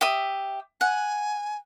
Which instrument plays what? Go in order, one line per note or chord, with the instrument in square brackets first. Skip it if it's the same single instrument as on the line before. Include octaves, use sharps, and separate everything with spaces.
[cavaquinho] G4 E5 D#6
[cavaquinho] F#5 [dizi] G#5